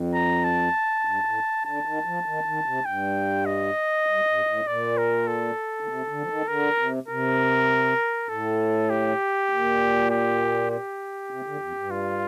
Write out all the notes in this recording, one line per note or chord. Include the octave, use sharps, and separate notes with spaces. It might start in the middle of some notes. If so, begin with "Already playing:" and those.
Already playing: F2
A#5
A5
G2
A2
D3 A5
D#3
F3
D#3
D#3
C3
G2 G5
D#5
G2
G2
A2
A#2 D5
A#4
A4
D3
C3
D3
F3
D#3
D3 A#4
C3
C3 A#4
A2 A4
G4
A#2
G4
G4
C3
D3
F2
G2
F4